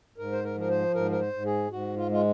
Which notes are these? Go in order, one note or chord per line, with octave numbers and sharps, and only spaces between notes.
G#2 A#4
C5
A#4
F3 A#4
C5
G#2 A#4
A#4
C5
G#2
G#4
G#2 F#4
F4
G#3 F4